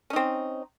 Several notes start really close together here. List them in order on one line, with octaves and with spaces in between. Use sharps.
C#4 D#4 C4